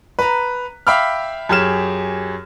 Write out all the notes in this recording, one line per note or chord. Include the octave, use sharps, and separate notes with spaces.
B4 A#5
E5 F5 G5 B5 D6 F6
F#2 G4 G#4 C#5 F6 E7